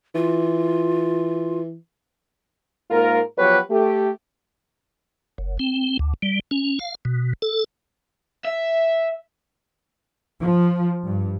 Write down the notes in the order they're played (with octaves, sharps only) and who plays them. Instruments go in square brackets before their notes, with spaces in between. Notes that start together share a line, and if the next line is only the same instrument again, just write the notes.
[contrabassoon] E3 [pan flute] F4
[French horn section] G#2 A#3 F4 A#4
F3 F#3 B3 G4 B4 C#5
A3 G4
[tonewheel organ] F#1
C4
D2
G3
C#4
F5
B2
A4
[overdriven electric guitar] E5
[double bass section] F3
G2